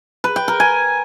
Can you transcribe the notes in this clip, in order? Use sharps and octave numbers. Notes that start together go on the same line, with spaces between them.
B4
G5
A#4
G#5